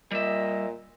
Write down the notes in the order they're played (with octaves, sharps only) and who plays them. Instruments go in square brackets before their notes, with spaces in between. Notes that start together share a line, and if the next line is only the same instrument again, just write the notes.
[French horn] A#2 [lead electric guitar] G3 E5 [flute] D#5